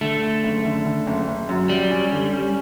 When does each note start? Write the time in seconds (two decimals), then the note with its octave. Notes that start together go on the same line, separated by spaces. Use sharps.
0.01 D3 A3
0.22 D3
0.43 F#1
0.65 D3
0.85 D3
1.07 F#1
1.27 F#1
1.49 F#2
1.69 F#2 G3
1.90 C#4
2.12 D3
2.33 C#4